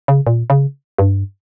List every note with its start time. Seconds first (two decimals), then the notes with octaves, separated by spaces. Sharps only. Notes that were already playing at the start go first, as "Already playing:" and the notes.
0.08 C#3
0.27 A#2
0.50 C#3
0.98 G2